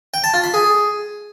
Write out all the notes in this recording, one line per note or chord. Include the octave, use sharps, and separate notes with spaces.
G5
A5
F4
B5
G#4